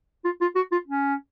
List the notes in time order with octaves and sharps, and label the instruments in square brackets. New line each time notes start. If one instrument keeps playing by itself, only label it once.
[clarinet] F4
F4
F#4
F4
C#4